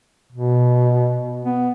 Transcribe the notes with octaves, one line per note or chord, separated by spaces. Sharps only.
B2
B3